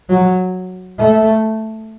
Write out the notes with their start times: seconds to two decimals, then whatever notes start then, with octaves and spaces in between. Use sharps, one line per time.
0.09 F#3
0.99 A3